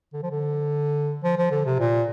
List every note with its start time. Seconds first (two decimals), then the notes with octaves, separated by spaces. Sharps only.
0.13 D3
0.23 F3
0.31 D3
1.24 F3
1.38 F3
1.51 D3
1.65 C3
1.79 A#2